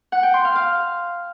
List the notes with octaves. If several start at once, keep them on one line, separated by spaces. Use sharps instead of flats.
F#5
G5
C6
F5
F5